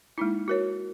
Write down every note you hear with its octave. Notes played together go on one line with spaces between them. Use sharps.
G#3 A#3 D#4 E4
F#4 A#4 C#5